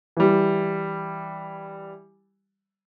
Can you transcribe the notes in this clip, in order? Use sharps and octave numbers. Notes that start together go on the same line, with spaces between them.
E3 G3